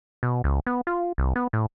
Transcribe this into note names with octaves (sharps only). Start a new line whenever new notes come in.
B2
C#2
B3
F4
C2
B3
A2